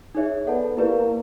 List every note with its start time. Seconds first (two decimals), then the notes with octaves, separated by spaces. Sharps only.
0.15 D#4 G#4 C#5 E5
0.47 B3 A4 D5 F#5 A5
0.77 A#3 E4 G4 B4 D5